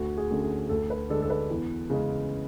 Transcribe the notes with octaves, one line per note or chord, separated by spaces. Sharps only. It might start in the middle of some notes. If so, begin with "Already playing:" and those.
Already playing: D2 F#4
G#4
D3 A3 C#4
G#4
D2 A4
B4
D3 G#3 D4 A4
A4
B4
E2
C#3 G#3 C#4